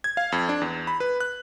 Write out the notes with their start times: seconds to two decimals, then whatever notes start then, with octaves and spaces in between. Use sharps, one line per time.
0.04 G#6
0.17 F5
0.32 F2
0.49 D4
0.61 E2
0.87 B5
1.00 B4
1.20 F#6